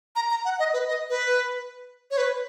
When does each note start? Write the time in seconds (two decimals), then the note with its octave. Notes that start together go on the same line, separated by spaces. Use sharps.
0.16 A#5
0.31 A#5
0.45 F#5
0.59 D#5
0.73 B4
0.88 D#5
1.10 B4
2.11 C#5
2.18 B4